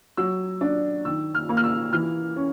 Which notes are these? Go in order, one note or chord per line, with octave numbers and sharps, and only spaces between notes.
F#3 E6
D4
D#3 E6
F6
A#3
F6
E6
E3 F6
C#4